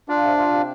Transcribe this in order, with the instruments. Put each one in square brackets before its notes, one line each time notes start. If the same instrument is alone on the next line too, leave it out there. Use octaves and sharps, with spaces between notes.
[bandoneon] D4 [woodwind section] F4
[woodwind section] C3
F4
C3